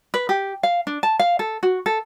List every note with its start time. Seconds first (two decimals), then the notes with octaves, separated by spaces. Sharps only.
0.14 B4
0.29 G4
0.63 F5
0.87 D4
1.03 A5
1.19 F5
1.39 A4
1.63 F#4
1.86 A4